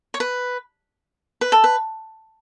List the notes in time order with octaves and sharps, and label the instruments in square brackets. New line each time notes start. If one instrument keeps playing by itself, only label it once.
[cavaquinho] C#5
B4
B4
A4
B4